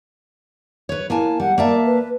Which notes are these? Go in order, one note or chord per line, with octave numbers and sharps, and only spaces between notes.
B4 C#5
A#3 E4 G#5 A5
G3 F#5
A#3 D5 E5 A5
B4